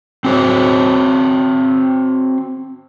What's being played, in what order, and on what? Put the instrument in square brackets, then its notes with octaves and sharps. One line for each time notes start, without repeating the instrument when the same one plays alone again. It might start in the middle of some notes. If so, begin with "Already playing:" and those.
[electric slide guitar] C4 F#4 C5 C#5